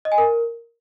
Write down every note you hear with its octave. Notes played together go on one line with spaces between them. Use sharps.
D#5
G#5
A#4